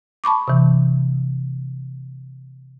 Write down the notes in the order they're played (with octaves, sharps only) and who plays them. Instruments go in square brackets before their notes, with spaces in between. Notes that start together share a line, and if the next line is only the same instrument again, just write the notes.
[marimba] A5 B5 C#6 D6
C3 E3